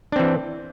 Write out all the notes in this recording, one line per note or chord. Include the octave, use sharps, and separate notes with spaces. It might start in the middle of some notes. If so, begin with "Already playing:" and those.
E3 C4 D4